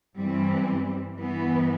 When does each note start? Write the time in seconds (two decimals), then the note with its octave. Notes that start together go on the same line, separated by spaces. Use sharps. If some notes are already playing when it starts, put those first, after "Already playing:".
0.17 G2 E3 G3 C4
1.14 G2 E3 B3